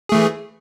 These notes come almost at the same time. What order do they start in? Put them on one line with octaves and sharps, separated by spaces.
G#4 A3 E3